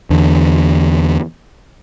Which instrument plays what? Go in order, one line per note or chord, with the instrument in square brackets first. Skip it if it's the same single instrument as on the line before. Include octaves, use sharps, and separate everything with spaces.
[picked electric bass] E2 D3